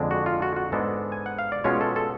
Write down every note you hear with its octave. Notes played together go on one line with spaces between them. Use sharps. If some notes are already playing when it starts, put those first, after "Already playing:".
Already playing: F2 D3 G#3 D4
F#4
F4
F#4
F#4
G#2 G#3 B3 D4 A4
G#5
F#5
F5
D5
B2 G#3 C#4 F4 C#5
A4
A4